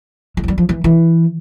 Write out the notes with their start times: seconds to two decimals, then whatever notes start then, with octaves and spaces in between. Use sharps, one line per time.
0.37 G#3
0.44 F3
0.48 G3
0.58 F3
0.69 E3
0.84 E3